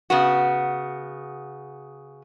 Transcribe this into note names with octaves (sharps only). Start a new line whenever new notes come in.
C#3 B3 F#4